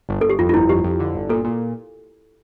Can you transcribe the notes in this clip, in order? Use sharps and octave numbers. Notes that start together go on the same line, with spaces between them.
G1
G1 A4
G4
F2 F4
F4
G1 E4
F2 G4
F2
D3
G1
A#2 A4
A#2